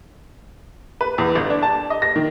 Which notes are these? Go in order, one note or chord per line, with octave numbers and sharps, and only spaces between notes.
B4
E2
G1
D4
A5
D#5
A#6
D#3